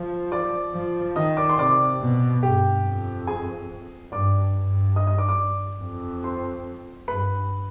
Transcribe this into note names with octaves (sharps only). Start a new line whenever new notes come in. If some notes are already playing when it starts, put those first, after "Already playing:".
Already playing: F3
D5 D6
F3
D#3 D#5 D#6
D5 D6
C6
C3 D5 D6
B2
G2 G4 G5
F2
G#4 G#5
G2 D5 D6
G2
D#5 D#6
D#5 D#6
D5 D6
D5 D6
F2
C5 C6
G2 B4 B5